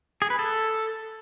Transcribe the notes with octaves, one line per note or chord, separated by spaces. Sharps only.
G#4
B4
A4